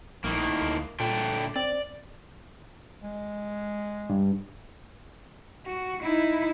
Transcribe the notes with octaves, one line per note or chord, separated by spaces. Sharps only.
A#1 A2 D#3 A#3
D2
A#2 D3 A3 G5
C4 D5
G#3
G2
F#4
D#4 E4